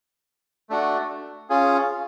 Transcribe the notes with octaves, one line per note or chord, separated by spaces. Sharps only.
A3 D4 F#4
C#4 F4 G#4